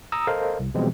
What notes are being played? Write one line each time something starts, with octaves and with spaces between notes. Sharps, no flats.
A#5 D#6 E6
A4 A#4 C5 D#5 F5
C2
B2 E3 F3 G3 G#3 C4